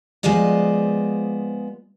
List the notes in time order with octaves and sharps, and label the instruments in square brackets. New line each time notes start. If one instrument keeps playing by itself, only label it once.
[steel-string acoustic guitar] F3 G#3 B3 C5 D5 D#5